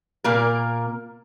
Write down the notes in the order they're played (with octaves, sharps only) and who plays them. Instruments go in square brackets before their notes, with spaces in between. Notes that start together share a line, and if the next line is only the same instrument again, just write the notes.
[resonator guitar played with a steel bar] A#2 A#3 A#4